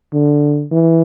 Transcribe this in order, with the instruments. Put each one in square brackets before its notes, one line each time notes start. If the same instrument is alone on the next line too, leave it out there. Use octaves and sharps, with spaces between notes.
[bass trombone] D3
E3